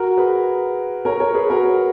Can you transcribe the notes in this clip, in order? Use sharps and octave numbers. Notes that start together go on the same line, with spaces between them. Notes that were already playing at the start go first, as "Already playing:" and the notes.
Already playing: F#4 A#4
G#4 B4
A#4 C#5
A#4 C#5
G#4 B4
F#4 A#4